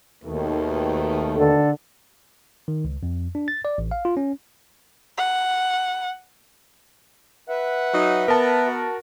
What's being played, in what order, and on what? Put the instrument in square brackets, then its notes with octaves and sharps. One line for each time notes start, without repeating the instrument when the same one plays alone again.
[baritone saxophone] D#2 [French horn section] B2 D#3 A3
[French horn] D3 [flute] A4
[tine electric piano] D#3
C#2
F2
D4
A6
D5
A1
F5
F4
C#4
[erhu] F#5
[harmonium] B4 E5 [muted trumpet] F#5
[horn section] F#3 D#4
[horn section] B3 [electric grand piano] A#4 A5
[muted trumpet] F#4